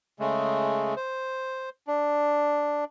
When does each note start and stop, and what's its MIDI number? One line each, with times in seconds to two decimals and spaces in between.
0.20 0.95 49
0.20 0.95 56
0.20 0.95 57
0.96 1.69 72
1.87 2.84 62